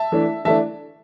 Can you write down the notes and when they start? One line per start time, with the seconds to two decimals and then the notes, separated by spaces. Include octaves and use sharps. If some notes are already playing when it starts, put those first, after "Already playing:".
Already playing: E5 A5
0.12 E3 A3 D4
0.45 E3 A3 D4 E5 A5